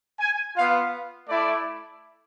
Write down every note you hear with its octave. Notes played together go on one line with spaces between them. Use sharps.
G#5
B3 F4 F5
A3 E4 D5